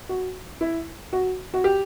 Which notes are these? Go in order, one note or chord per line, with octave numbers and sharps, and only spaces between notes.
F#4
E4
F#4
F#4
G4